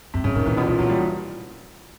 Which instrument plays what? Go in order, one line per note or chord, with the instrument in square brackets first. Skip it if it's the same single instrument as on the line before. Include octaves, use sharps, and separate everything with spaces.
[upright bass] G2 [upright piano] C3
[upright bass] G#2 [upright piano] C#3
[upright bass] A2 [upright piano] D#3
[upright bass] A#2 [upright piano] E3
[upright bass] B2 [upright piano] F3
[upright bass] B2 [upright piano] F3
[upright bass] A#2 [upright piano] F#3
[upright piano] G3